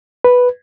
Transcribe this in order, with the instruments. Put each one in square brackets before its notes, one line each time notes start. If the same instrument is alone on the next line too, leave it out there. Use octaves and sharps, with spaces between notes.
[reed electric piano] B4